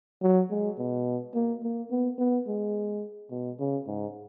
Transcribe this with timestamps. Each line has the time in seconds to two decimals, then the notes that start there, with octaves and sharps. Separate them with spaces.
0.22 F#3
0.50 G#3
0.78 B2
1.35 A#3
1.63 A#3
1.91 B3
2.19 B3
2.47 G#3
3.31 B2
3.59 C#3
3.87 G#2